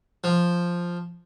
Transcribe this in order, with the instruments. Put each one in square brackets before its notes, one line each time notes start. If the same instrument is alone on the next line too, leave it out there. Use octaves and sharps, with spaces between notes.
[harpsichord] F3